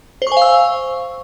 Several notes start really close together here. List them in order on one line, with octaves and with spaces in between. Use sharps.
C5 C#6 G#5 F5 E6